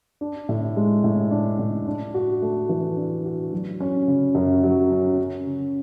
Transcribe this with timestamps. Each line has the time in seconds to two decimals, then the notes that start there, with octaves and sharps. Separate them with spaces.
0.21 D4
0.49 A2
0.77 G#3
1.04 A2
1.31 D4
1.59 A2
1.87 D4
2.14 F#4
2.42 A3
2.69 E3
2.97 D4
3.25 F#4
3.53 F#3
3.80 C#4
4.08 C#3
4.35 F#2
4.63 F#3
4.91 C#4
5.18 C#4
5.47 C#3